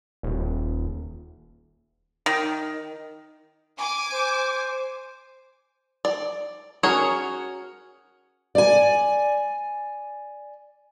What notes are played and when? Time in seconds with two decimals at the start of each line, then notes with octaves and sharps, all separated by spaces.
0.23 D#1
2.26 D#3
3.77 G#5 D6
4.12 C5
6.05 D5
6.83 C#4 F#4 G#4 A#4 C#5
8.55 D5 G#5